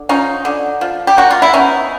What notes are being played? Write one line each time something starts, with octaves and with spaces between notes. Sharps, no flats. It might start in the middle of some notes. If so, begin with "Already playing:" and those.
Already playing: D3
F3 C#4 D#4
D3
F3
G4
A#3 F#4
F4
E4
B3 C#4 D#4